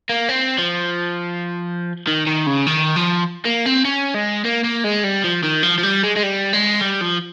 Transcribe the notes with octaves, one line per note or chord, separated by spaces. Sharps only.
A#3
C4
F3
D#3
D#3
C#3
D#3
F3
A#3
C4
C#4
G#3
A#3
A#3
G#3
G3
F3
D#3
F3
F3
G3
G#3
G#3
G3
G#3
G3
F3